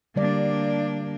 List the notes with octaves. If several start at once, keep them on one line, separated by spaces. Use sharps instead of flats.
D3 G3 A#3 D4 D5